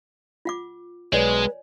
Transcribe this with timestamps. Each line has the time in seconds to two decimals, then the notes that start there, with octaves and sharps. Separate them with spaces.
0.45 F4 F#5 D6
1.13 B1 G#3 B4 C#5 D5 G#5